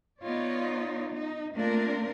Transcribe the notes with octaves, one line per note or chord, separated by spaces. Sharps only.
B3 D#4 F4 C#5 D5
D#4
A3 A#3 C4 D4 F4 A#4